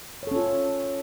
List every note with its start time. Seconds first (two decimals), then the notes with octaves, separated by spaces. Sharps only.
0.23 C#5
0.27 A4
0.31 C#4
0.36 F4